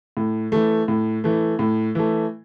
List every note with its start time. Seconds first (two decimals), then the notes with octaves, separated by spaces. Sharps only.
0.17 A2
0.52 E3 A3
0.88 A2
1.24 E3 A3
1.59 A2
1.95 E3 A3